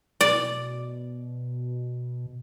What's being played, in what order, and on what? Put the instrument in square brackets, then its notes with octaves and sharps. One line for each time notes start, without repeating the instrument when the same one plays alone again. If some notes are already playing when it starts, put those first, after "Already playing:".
[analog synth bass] B2 [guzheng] D5